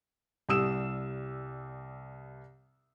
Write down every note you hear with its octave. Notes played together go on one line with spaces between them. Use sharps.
C2 G3 D#6 E6 E7